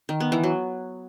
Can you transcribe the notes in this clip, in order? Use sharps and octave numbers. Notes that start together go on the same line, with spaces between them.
D#3
B3
E3
F#3